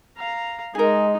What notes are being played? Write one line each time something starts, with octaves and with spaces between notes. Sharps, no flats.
F5 A#5
G#3 D#4 G#4 A#4